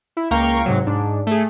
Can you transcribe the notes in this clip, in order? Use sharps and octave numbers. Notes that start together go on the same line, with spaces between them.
E4
C#2 A#3 F5 G5 A#5 C#6
G#2 C3 F#3
G#2 D4
A3 G#4